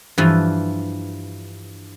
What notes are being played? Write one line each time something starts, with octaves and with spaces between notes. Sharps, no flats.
G2 E3 F3